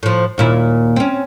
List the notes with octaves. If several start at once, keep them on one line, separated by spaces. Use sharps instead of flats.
A2 F3
D#2 A#2 E4
C4 C#4